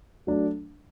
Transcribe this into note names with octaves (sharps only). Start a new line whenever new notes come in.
F#3 A3 D4